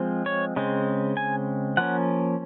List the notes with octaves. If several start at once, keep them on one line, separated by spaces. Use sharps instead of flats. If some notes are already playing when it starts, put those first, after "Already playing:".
Already playing: F3 G#3 C4
C#5
C#3 G#3 C4
G#5
F3 A#3 C#4 F#5